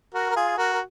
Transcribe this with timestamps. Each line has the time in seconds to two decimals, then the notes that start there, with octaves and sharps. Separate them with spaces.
0.14 F#4 A#4
0.31 A#4
0.36 F4 G#4
0.58 F#4 A#4
0.73 A#4